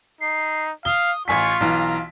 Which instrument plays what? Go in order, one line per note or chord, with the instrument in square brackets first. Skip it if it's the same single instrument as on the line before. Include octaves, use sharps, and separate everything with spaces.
[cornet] D#4 [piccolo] C7
[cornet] F5 [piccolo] D#6 [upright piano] G7
[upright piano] A1 G#5 B6 [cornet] F4 [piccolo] C#6
[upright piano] B1 E3 [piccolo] A#5